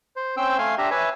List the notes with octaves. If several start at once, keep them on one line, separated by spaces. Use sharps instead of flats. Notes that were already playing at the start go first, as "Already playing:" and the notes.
C5
C4 C#4 C5 G5 E6
A3 F5 G#5 C6
D4 G4 E5 A#5
B4 C#5 E5 G#5